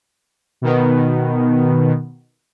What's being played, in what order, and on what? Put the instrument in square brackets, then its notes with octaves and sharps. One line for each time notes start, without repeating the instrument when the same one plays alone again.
[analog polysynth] B2 D#3 B3